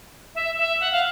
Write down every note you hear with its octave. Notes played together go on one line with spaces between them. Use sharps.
E5
E5
F#5
F5